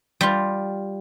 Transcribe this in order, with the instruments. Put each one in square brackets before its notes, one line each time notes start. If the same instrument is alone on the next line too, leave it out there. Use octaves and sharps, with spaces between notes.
[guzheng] G3 F4